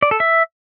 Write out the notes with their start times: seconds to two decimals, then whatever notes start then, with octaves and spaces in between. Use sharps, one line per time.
0.02 D5
0.11 A4
0.20 E5